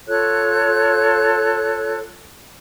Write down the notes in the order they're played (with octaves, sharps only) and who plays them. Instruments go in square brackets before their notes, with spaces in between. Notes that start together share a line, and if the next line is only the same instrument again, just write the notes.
[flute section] F4 A4 C#5 F#6